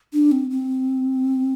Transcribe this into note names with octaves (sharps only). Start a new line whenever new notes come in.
D4
C4
C4